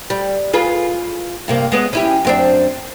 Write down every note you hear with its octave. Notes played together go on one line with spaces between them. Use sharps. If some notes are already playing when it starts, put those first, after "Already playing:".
G3
F4 G#4 B4
G2 C3 A#3
G#3 B3 C#4
C#4 E4 G4
F#2 C4 D4